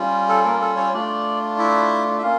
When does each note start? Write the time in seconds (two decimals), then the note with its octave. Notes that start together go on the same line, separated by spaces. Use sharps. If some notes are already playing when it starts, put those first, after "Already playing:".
Already playing: G3 C#4 F4
0.29 A4
0.45 A#3 A#4
0.61 A4
0.77 C#4 C#5
0.93 A3 D4 F4 D5
1.58 E4 E5
2.18 E5
2.22 A#3 C#4 F4 F5